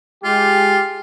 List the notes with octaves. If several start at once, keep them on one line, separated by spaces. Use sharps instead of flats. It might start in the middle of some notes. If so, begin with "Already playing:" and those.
G#3 F4 G4